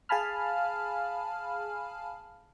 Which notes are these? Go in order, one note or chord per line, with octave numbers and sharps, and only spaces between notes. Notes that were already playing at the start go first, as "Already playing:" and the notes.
G#4 F5 G#5 A5 B5 F6